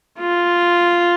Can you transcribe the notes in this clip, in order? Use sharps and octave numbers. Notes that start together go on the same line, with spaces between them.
F4